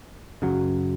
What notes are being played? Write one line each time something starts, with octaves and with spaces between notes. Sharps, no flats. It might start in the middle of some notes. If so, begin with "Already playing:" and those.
F#2 C#3 F#3